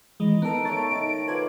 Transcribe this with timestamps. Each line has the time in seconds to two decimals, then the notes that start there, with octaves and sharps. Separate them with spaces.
0.20 D#3 E3 G#3 D#5
0.42 B3 D#4 A4 A#4 D7
0.65 D#3 A3 C#5 A6
0.91 D#3
1.28 F4 B4 C5 G#5 D6 G#6